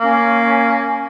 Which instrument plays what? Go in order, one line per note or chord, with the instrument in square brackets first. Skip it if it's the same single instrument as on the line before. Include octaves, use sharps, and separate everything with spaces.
[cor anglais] A#3 [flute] C#4